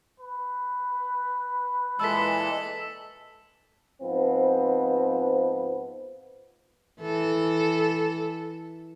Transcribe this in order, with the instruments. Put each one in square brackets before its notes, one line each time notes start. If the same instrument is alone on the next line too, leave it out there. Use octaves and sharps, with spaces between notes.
[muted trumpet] B4
[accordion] A#2 E3 G#3 [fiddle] A4 [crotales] E6 B6
[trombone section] G#2 F3 B3 C4 B4
[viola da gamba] E3 A4